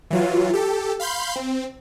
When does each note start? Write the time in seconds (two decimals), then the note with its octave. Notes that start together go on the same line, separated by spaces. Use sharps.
0.11 E3 F#3 F4
0.53 G4 A4
1.00 F5 B5 C6 G6
1.36 C4